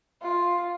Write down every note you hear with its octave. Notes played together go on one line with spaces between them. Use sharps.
F4